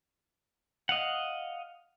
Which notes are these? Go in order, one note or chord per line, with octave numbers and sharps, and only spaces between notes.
D#5 F5 F#5